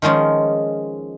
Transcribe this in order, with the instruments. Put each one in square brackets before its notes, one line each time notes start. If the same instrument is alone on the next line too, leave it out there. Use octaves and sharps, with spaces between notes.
[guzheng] D#3 F3 G#3 C#4